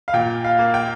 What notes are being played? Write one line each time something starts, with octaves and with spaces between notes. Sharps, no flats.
F5
A#2 G5
F5
A#3
G5